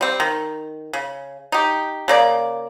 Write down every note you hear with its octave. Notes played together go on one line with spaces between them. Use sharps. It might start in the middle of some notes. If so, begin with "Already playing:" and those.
G3 C4
D#3
C#3
D#4 G4
C#3 A#3 D5